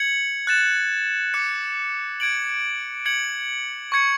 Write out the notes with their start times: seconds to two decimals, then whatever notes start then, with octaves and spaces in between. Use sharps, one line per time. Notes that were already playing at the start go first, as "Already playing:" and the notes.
Already playing: G#6 C#7 F#7
0.47 F#6 A6 E7
1.34 D6 F#6 C#7
2.20 G#6 D7 F#7
3.05 G#6 C#7 F#7
3.92 C#6 G#6 C#7